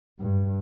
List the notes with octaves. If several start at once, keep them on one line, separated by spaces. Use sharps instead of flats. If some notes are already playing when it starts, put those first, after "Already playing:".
G2